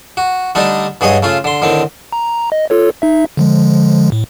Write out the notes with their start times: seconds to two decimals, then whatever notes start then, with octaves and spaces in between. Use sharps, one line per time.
0.17 F#4
0.55 D3 G3 A3 D4 D#4
1.01 G2 F#3 G#4 C#5 D#5
1.23 C#3 A3 F4
1.44 D3 C6
1.62 A2 D3 D#3 C4
2.13 A#5
2.52 D#5
2.70 F4 A4 C#5
3.02 D#4 E5
3.37 D3 F3 G#3
4.12 A2